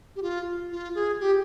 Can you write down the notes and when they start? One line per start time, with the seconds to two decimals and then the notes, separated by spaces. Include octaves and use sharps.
0.16 G4
0.22 F4
0.72 F4
0.95 G#4
1.20 G4